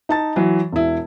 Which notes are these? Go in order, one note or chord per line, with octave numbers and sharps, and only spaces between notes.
D#4 A5 A6
E3 F#3
E1 E4